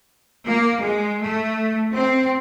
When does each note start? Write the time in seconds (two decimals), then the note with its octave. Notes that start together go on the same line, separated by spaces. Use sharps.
0.47 A#3
0.82 G#3
1.21 A3
1.95 C4